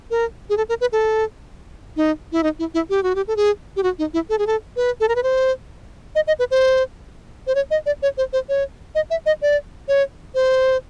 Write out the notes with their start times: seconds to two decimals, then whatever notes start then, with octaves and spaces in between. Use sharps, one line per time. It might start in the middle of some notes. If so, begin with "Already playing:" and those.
0.11 A#4
0.50 G#4
0.57 A4
0.69 A#4
0.81 B4
0.92 A4
1.97 D#4
2.32 E4
2.43 D#4
2.59 E4
2.74 E4
2.90 G4
3.03 F#4
3.15 G4
3.28 A4
3.36 G#4
3.76 G4
3.83 F#4
3.99 D#4
4.14 E4
4.30 A4
4.38 G#4
4.47 A4
4.76 B4
5.00 A4
5.09 A#4
5.16 B4
5.23 C5
6.15 D#5
6.27 D#5
6.39 B4
6.51 C5
7.47 C5
7.55 C#5
7.71 D#5
7.86 D5
8.03 C#5
8.17 C5
8.33 C5
8.49 C#5
8.95 D#5
9.10 E5
9.26 D#5
9.42 D5
9.88 C#5
10.35 C5